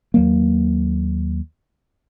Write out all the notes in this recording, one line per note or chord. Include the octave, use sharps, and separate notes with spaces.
D#2 F#3 A#3